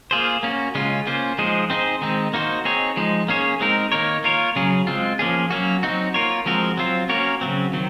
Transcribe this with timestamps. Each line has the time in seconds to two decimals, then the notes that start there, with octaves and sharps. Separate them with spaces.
0.11 A#3 F4 G#4 C5
0.43 A#3 C#4 F#4
0.75 C#3 G#3 C#4 F4
1.07 A#3 C#4 F4 C5
1.38 F3 G#3 D#4 G#4 C5
1.70 C4 D#4 G#4 C5
2.02 D#3 G#3 C4 D#4
2.33 A#3 D#4 F#4 C5
2.65 C4 D#4 G#4 C#5
2.97 F3 G#3 D#4
3.28 A#3 C#4 G#4 C#5
3.60 G#3 C4 D#4 A#4
3.92 D#3 A#3 D#4 A#4 C#5
4.24 A#3 F4 A#4 C#5
4.56 C#3 F#3 C#4 G#4
4.87 G#3 C4 F4
5.19 F3 A#3 C#4 G#4
5.50 F#3 A#3 C#4 F#4
5.83 F#3 C4 D#4 F#4
6.14 A#3 F4 A#4 C#5
6.46 F3 G#3 C4 F#4 A#4
6.77 F#3 C4 F4 C5
7.09 A#3 C#4 F#4 A#4 C#5
7.41 C#3 F#3 C4
7.73 D#3 F#3 C4